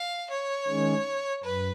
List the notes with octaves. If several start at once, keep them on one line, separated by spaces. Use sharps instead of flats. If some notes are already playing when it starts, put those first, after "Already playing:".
Already playing: F5
C#5
D#3 G#3 C#4
F#2 B4